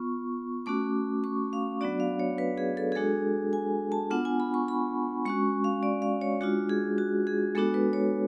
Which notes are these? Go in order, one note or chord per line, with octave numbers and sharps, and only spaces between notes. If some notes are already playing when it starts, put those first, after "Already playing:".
Already playing: B3 F4 C#6
A3 C#4 F#4 D6
C#6
F5
F#3 B3 D4 F#4 D5
F5
C#5
B4
G#4
A4
G#4
G#3 D4 F#4 A4
G#5
A5
B3 D4 F4 F#5
G#5
B5
C#6
B5
G#3 C#4 F#4 C#6
F5
D5
F5
C#5
G#3 D4 F4 F#4
G#4
F#4
G#4
G#3 B3 D4 F#4 A4
B4
C#5